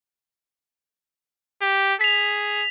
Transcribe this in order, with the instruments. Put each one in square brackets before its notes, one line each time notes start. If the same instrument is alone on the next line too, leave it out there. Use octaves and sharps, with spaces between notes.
[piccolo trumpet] G4
[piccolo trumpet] G#4 [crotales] B6 F7